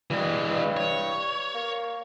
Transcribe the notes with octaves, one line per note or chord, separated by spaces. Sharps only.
G2 E3 G#3
G2
C#5
A#3